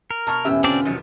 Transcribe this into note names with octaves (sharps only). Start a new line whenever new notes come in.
A#4
B2 A5 C#6 F6
E1 A2 E3 B3 C#4 G4 E5
D3 C4 D4 F4 D5
C3 D#3 F3 F#3